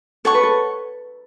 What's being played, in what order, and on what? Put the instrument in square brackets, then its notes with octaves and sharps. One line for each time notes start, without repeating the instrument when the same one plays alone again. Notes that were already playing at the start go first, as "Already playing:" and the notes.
[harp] A4 [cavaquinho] C#5 F#5 C#6
[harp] B4
A4